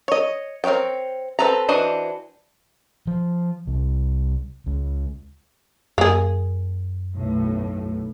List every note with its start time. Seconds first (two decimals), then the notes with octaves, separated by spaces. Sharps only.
0.08 C#5 D#5
0.64 C4 A#4 B4 C#5 G5
1.39 C4 G#4 A4 B4 A#5
1.69 E3 D4 F#4 C5 D#5
3.07 F3
3.67 C2
4.66 C#2
5.98 F#2 A#3 G#4
7.17 B1 A2